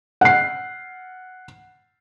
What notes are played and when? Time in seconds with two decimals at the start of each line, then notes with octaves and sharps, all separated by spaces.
0.21 F#5 C7